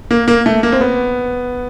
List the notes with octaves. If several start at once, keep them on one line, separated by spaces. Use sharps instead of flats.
A#3
A#3
A3
A#3
C4
B3